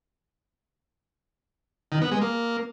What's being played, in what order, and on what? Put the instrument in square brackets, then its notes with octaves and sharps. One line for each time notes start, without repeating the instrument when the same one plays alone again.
[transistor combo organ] D#3
B3
G#3
A#3